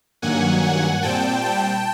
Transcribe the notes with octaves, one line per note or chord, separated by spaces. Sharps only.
G2 D#3 F#3 A#3 F#5 G#5
F#5 G#5
A#2 G3 C4 G5 A5
G5 A5